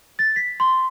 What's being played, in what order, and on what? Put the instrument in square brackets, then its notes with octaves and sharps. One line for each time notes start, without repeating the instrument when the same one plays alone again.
[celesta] A6
B6
C6